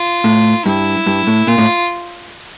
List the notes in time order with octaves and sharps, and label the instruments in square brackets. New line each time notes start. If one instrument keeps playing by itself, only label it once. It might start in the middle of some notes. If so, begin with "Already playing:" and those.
Already playing: [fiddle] F4
[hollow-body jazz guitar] A2
[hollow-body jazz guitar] G2 [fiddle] E4
[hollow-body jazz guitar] G2
A2
[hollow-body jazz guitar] A#2 [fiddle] F4
[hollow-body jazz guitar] A2